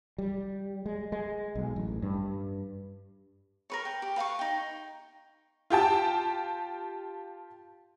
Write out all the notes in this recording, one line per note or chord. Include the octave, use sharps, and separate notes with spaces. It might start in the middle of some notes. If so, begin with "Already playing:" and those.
G3
G#3
G#3
B1
A1
G2
A#4 B4 C#5
G5
G4
B4 F5 A#5 C#6
D#4 G5
F4 G4 G5 A5